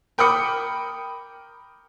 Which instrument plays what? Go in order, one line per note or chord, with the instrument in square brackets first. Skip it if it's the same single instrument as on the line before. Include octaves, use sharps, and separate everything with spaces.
[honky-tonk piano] A#4 G5 B5 D6 D#6 C#7